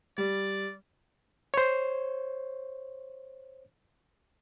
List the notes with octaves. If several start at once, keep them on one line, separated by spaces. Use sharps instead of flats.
G3 D5
C5 C#5